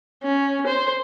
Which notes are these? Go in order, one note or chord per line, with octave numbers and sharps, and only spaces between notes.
C#4
C5